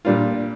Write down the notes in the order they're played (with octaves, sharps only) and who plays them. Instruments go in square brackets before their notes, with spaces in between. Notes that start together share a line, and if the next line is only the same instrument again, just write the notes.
[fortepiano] A#2 G3 D4 F4